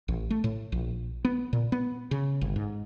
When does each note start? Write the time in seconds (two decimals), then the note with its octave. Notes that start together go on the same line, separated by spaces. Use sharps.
0.08 A1
0.30 A3
0.44 A2
0.72 A#1
1.25 B3
1.53 A#2
1.72 B3
2.11 C#3
2.41 G1
2.56 G#2